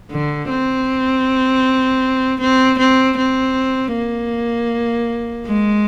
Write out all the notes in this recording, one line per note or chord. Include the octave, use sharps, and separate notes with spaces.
D3
C4
C4
C4
C4
A#3
G#3